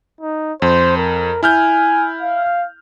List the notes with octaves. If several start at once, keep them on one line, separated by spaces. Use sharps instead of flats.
D#4
F2 C5
A#4
E4 G#5 F6 G6
F5